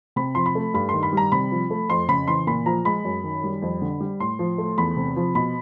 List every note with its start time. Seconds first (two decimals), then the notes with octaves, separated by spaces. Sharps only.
0.16 C3 B5
0.35 F3 C6
0.46 B5
0.55 A3
0.74 G2 B5
0.89 D#3 C6
1.03 B5
1.13 G3 A#5
1.32 C3 B5
1.52 F3
1.70 A3
1.89 F2 C6
2.09 C#3 B5
2.28 E3 C6
2.47 A#2 B5
2.66 F3 A#5
2.85 G#3 B5
3.05 F#2
3.24 D#3
3.44 G3
3.62 F2
3.82 D3
4.00 G3
4.20 A2 C6
4.39 F3
4.58 A3
4.78 E2 B5
4.97 C3
5.16 F3
5.35 B2 B5